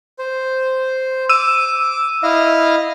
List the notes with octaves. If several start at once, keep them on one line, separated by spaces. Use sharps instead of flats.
C5
D6 E6 D#7
E4 D#5 F5